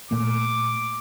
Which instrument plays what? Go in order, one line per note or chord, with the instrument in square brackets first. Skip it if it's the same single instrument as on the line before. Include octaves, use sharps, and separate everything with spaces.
[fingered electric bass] A#2 A3 A#3 [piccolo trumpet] D6